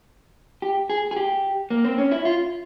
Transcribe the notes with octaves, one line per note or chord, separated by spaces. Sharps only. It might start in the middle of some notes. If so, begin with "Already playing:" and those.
G4
G#4
G#4
G4
A#3
C4
C#4
E4
F4